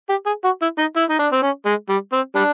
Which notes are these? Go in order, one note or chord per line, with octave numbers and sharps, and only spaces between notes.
G4
G#4
F#4
E4
D#4
E4
D#4
D4
C4
C#4
G#3
G3
C4
G3 D4